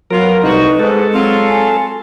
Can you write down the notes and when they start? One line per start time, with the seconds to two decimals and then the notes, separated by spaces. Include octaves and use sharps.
0.11 F#3 B3 F4 A#4
0.43 C2 A2 D#4 F#4 B4
0.80 G#2 G#3 A4
1.13 F#3 C4 F4
1.48 G#5